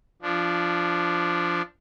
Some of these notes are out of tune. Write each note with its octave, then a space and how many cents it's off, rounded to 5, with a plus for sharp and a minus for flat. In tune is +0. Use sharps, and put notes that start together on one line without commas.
F3 -10 D4 +0